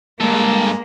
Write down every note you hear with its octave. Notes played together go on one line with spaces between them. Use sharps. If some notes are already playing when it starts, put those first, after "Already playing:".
G2 G#3 A#3 A4